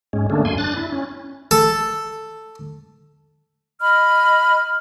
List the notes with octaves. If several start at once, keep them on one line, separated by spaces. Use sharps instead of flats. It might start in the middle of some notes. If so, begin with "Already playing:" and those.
G#2 G#3 C#4
D3 A3 A#3 C#4 D4
F#2 G#5 C6
D4 F#6 A6
E4
C#4
A4
D#5 B5 F6